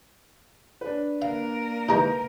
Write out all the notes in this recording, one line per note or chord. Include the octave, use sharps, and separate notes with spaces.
D4 B4
A#3 A#4 F5
E3 G#3 D#4 B4 A#5 D#6 G6